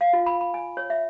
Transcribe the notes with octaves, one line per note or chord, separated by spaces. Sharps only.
F5
F4
B5
B5
G#5
C#5
E5